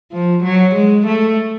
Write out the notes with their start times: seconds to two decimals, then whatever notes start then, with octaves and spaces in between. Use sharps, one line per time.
0.12 F3
0.44 F#3
0.75 G#3
1.06 A3